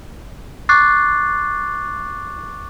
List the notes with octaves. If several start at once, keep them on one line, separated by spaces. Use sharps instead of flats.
C#6 D6 F#6 A6 C7